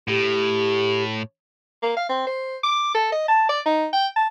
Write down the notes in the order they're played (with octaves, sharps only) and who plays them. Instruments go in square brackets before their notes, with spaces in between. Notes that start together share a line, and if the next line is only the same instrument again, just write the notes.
[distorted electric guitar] A2 [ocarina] G4
[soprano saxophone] A#3
F5
C4
C5
D6
A4
D#5
A5
D5
D#4
G5
A5